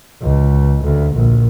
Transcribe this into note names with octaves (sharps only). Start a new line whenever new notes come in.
C#2
D2
A#1